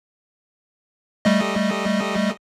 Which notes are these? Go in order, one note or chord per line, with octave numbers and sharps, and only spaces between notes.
G3 A3 D#5